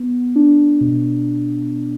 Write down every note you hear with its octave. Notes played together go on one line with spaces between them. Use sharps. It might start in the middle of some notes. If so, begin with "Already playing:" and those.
Already playing: B3
D4
B2